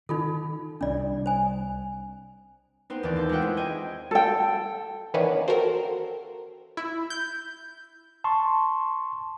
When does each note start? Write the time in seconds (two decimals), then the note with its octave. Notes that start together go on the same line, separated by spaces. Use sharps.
0.09 D#3 D#4 F4 A4
0.81 C2 C3 D4 D5
1.26 C5 G#5
2.90 B3 C4 D#4 C5
3.03 D#2 E3 B3 D5
3.16 A4 C6 G6
3.29 G#3 E4 F4 E5 F#5 G5
3.41 C4 E4 G#4 C5
3.57 D#5 G5 G#5
4.11 A4 G5
5.14 D#3 E3 A#3 B3 C#4 D4
5.48 C4 F#4 A4 A#4
6.77 E4
7.10 G6
8.24 A5 C6 C#6